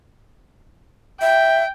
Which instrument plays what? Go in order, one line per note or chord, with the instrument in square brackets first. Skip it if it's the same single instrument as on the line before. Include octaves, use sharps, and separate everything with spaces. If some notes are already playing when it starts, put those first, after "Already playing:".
[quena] E5 [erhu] G5